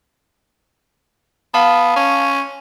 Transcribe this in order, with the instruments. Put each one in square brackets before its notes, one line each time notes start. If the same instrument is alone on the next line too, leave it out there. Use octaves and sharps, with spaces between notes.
[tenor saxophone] B3 [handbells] F5 A5
[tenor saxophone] C#4